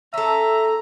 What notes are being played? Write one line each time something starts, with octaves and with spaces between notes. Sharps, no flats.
C#4 A4 E5 A#5